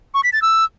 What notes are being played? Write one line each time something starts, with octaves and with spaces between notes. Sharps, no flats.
C#6
B6
A6
E6